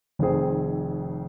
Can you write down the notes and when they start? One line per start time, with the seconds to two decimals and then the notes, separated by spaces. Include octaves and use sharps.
0.19 F1 F2 D#3 C4 G#4